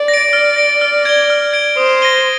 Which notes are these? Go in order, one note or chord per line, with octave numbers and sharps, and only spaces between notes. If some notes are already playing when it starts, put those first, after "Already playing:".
Already playing: D5
A#6
D7
D5 F6
A#6 D7
F6
G#6 D7 G7
F6
G#6 D7 G7
C5 D#6
A#6 D#7 G7